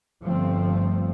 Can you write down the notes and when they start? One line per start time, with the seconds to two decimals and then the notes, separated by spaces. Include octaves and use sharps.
0.24 G1 F3 A3 C4